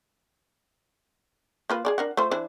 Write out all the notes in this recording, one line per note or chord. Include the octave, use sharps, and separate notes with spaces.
A#3 F4 B4
G#4 A4 D5
D4 A#4 F#5
A3 F4 C5
E3 D4 C5